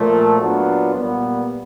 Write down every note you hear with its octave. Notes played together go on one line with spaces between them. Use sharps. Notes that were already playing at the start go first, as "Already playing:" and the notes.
Already playing: A#2 F3 A3
A#2 F#3 B3 D4 F4
A#2 G3 B3